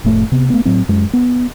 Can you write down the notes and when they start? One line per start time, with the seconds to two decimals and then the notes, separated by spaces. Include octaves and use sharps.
0.04 F1 A2 A3
0.32 C3 B3
0.50 A3 B3
0.65 A2 F#3 C4
0.89 F#2 G#3
1.13 B3